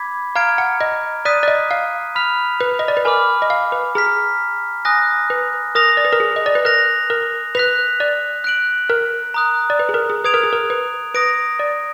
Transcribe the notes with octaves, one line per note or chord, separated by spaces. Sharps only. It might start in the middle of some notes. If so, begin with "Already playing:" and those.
Already playing: B5 D6 G#6 B6
F5 A#5 F6 G#6 D7
F#5
D#5
D5 D#6 F#6 B6 D#7
D5
D#5
F5
B5 F6 B6 F7
B4
D#5
D5
B4
A#4 G#5 B5 D6 F6
D#5
F5
B4
G#4 A#5 F6 B6
G#5 D#6 F#6 A#6
B4
A#4 D#6 A#6 F7
D5
B4
A#4
G#4
D#5
D5
B4
A#4 F#6 A#6 F7
A#4
B4 F#6 B6 F7
D5
F#6 D7 F#7
A#4
A#5 D#6 F#6
D5
B4
G#4
A#4
G#4
B4 D#6 G#6 D7 F7
A#4
G#4
A#4
B4
B4 D#6 A#6 D7
D5